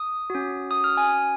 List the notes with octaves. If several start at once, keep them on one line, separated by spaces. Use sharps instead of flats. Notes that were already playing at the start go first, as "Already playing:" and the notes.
Already playing: D#6
C#4 F#4
D#6
F6
G#5